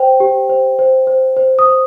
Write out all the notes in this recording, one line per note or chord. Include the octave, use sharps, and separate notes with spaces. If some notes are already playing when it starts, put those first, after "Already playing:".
Already playing: C5 G5
G4
C5
C5
C5
C5
D#6
C5